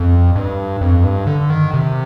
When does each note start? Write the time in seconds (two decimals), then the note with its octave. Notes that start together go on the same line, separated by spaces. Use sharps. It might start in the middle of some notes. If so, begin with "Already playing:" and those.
Already playing: F2
0.36 G2
0.81 F2
1.04 G2
1.27 D3
1.50 D#3
1.74 C3